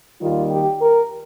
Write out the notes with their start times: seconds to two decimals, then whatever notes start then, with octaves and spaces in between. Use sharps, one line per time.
0.20 D#2 D#3 G3 F4
0.50 G4
0.81 A#4